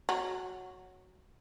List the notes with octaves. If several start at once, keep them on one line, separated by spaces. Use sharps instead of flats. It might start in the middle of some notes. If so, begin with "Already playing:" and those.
F#3